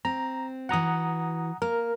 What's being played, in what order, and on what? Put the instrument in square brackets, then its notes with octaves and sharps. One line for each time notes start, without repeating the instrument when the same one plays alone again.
[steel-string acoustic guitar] C4 [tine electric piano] A#5
[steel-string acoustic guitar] E3 F#4 [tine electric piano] F#5 A#5 D#6
[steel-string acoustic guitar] A#3 [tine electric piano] A#4